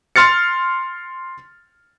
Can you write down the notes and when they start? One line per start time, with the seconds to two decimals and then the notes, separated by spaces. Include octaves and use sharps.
0.16 C6 F6 A6 C#7